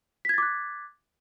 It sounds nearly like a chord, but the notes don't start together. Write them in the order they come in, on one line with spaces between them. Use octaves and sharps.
B6 G#6 A6 D6 F#6